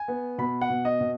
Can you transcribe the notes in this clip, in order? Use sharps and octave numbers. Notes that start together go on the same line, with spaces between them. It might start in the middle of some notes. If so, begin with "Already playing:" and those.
Already playing: G#5
B3
B2 B5
F#5
B2
D#5
B2